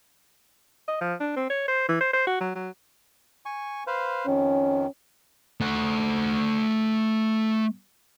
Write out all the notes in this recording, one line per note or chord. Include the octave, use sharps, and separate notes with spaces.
D#5
F3
D4
C4
C#5
C5
E3
C5
C5
F#4
F#3
F#3
G#5 C#6
B4 C5 F5
F2 D#3 C#4
A3 F#5